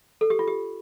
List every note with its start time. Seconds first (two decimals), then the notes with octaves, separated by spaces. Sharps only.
0.21 A4
0.30 G4
0.39 F4
0.47 G4